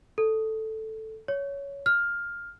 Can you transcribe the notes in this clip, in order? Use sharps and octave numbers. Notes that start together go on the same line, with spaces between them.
A4
C#5
F6